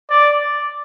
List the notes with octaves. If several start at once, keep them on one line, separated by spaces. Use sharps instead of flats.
D5